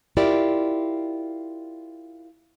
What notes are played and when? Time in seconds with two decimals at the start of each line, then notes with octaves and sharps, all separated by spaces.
0.17 E4 F4 G4 A#4 D5